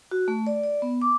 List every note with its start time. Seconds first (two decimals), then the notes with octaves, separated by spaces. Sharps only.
0.11 F#4
0.28 A3
0.47 D5
0.64 D5
0.82 B3
1.02 D6